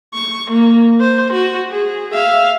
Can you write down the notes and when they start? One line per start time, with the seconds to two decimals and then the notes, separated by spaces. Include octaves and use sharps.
0.14 C#6
0.50 A#3
1.00 C5
1.33 F#4
1.71 G#4
2.14 E5 F5